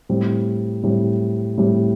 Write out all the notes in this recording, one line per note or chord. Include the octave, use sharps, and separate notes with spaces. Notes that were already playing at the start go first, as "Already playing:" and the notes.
A2 G3 C4
A2 G3 C4
A2 G3 C4